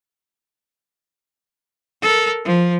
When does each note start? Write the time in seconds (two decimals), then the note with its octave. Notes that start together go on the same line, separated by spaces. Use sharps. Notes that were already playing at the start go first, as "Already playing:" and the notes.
2.02 A4 A#4
2.45 F3